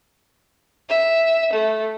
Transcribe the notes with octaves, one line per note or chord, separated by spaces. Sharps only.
E5
A3